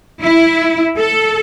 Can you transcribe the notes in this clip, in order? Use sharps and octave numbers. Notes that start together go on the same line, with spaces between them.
E4
A4